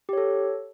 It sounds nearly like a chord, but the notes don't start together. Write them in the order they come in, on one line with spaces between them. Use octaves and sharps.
G4 C#5 A4